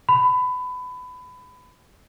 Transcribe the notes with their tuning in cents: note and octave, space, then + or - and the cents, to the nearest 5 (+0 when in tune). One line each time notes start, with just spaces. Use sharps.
B5 +20